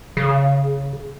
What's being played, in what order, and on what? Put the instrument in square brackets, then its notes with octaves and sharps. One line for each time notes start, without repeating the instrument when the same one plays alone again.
[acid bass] C#3